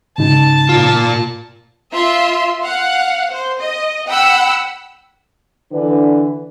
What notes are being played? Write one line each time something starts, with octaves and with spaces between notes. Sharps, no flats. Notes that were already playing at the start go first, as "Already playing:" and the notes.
G#2 C#3 D#4 A5
A#2 F4
F4 E5 C6
F5 F#5
C5
D#5
F#5 G5 B5 E6
D3 E3 D4 B4